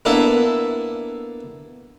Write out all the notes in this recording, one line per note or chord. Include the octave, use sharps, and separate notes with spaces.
A#3 B3 D4 E4 A4 E5